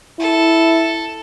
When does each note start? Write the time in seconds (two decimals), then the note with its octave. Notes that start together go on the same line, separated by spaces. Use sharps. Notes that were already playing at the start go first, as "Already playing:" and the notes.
0.19 E4 A4